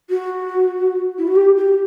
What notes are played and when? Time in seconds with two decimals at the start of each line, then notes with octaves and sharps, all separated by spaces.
0.10 F#4
1.18 E4
1.27 F#4
1.36 G4
1.57 G4